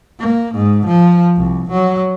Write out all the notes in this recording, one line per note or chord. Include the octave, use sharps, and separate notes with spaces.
A#3
G#2
F3
C2
F#3